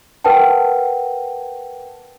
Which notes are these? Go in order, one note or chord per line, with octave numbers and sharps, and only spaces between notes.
A#4 B4 F#5 G5 A5